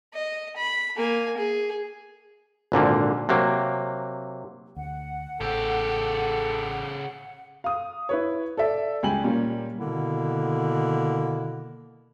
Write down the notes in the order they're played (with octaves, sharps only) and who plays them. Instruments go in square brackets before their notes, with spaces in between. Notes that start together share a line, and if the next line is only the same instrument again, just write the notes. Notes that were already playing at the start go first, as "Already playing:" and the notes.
[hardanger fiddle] D#5
B5
A#3 G#5
G#4
[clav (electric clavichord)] G#1 A#2 D3 A#3
C3 F#3 A#3
[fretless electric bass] D2 [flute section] F#5
[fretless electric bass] A1 [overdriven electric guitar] C#3 G4 [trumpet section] A4
[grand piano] F5 D#6
E4 B4 C#5
A4 D5 E5
C#2 G3 G5 G#5 F#7
A#2 G3 A#3 C#4
[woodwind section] B2 D3 D#3 A#3 B3 E4